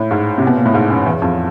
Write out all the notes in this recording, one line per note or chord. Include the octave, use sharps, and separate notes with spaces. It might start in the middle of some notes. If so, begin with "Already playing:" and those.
Already playing: A2
G#2
C3
B2
A#2
A2
G#2
F#2
E2
F2